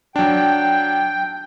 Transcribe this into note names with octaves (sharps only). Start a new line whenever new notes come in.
F#3 D4 G5